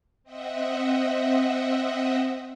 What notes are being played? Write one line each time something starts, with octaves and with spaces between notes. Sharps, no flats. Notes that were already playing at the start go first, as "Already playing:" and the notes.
C4 D#5 E5 F#5